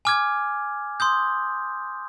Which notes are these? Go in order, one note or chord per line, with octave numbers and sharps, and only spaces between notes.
G#5 D6 F6 G#6
C6 D#6 G6